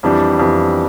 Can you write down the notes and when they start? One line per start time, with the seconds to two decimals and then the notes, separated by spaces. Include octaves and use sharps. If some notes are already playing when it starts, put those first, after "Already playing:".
0.03 F2 E3 G3 D4
0.39 F2 E3 G3 D4